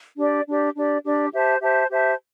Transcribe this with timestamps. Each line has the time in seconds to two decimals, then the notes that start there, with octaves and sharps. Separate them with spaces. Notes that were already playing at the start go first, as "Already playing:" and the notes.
0.18 D4 G4 D5
0.46 D4 G4 D5
0.75 D4 G4 D5
1.04 D4 G4 D5
1.32 G4 C5 E5 A5
1.62 G4 C5 E5 A5
1.90 G4 C5 E5 A5